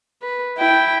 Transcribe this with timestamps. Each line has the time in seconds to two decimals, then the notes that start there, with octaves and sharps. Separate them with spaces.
0.22 B4
0.58 E4 G5